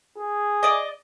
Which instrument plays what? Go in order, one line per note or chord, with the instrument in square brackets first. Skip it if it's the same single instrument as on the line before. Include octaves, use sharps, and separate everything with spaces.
[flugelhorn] G#4
[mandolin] D5 D#5